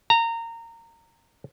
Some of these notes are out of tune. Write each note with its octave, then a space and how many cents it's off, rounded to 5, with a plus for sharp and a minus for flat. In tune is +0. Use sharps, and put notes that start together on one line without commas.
A#5 -20